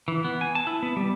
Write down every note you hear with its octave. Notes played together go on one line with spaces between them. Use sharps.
E3
B3
G#5
A5
E4
B3
G3